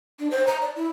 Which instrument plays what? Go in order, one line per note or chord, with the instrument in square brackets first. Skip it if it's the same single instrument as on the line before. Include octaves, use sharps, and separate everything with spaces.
[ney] D4
C5
A#5
D5
E4